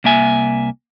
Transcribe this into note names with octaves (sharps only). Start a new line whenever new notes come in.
C2 A#3 E5 G#5